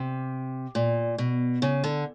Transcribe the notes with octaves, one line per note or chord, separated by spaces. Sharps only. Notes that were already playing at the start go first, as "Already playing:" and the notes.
Already playing: C3
A#2
B2
C#3
D3